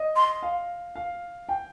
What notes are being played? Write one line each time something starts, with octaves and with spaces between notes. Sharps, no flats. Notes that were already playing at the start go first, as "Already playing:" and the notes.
Already playing: D#5
C6
F5
F5
G5